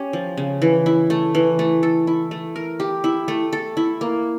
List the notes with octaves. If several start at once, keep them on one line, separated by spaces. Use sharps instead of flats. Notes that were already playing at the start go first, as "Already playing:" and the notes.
Already playing: C#4 G4
F3
C#3
E3
E4
A3
E3
A3
A4
E4
A3
A#4
G4
E4
A3
A4
E4
A#3